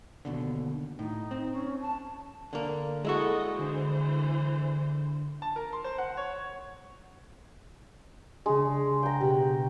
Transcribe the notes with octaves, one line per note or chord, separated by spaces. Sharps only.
D#2 B2 D3
A2 D#4
C4
C#4
A5
D3 A#3
G#3 E4 F#4 A4 D#5
D3 E3 C5
A5
A#4
C6
C5
F#5
C#5
C#3 G#3 D4
G5 A#5
B2 G4 B4